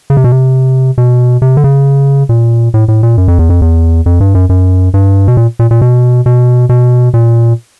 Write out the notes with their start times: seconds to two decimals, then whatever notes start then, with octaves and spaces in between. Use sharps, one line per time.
0.10 C#3
0.17 C3
0.24 B2
0.32 C3
0.98 B2
1.42 C3
1.57 D3
1.64 C#3
2.29 A#2
2.74 A2
2.88 A2
3.03 A#2
3.18 F#2
3.28 F2
3.39 E2
3.50 F2
3.62 E2
4.06 F2
4.20 G2
4.35 F#2
4.49 F#2
4.94 G2
5.28 B2
5.37 A#2
5.59 A#2
5.71 A#2
5.81 B2
6.26 B2
6.69 B2
7.14 A#2